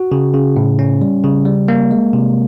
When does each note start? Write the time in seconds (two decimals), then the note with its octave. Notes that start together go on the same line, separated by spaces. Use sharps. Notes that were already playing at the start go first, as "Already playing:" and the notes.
Already playing: F#4
0.12 C#3
0.34 C#3
0.56 A2
0.79 C#4
1.02 G3
1.24 C#3
1.45 G3
1.68 A#3
1.91 G#3
2.13 C3